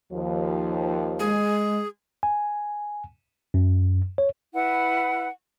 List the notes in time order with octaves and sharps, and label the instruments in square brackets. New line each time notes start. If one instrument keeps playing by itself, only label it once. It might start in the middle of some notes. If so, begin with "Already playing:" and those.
[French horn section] D#2 F3
[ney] G#3 [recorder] G#4
[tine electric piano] G#5
F#2
C#5
[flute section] E4 B4 F#5